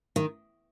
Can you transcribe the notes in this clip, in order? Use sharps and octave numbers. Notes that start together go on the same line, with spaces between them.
D#3